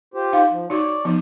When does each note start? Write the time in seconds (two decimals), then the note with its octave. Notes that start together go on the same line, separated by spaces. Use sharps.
0.14 F4 G4 C5
0.33 D#4 F5
0.50 F3
0.70 D#4 F#4 C#5 D5
1.05 F3 B3 D#4